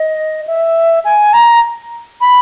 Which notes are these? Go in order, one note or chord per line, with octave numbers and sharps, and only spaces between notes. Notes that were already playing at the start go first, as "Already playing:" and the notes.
Already playing: D#5
E5
G#5
A#5
B5